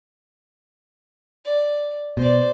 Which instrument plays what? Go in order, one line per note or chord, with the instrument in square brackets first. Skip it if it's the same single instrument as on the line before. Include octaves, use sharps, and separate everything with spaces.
[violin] D5
[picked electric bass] B2 [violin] C5 D5